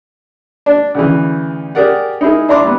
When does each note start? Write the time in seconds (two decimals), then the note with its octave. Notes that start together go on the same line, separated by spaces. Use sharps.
0.66 D4
0.95 D2 C#3 E3
1.75 G4 G#4 A#4 D5 F#5
2.21 D#4 E4 G#4 A#4
2.49 D4 E4 A#5 C6 D6
2.64 G2 B3